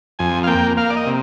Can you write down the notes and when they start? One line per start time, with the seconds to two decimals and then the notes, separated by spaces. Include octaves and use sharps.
0.19 F2 G#5
0.44 F5
0.47 A#3 G5
0.77 A#3 F5
0.90 D5
0.96 D#5
1.06 C3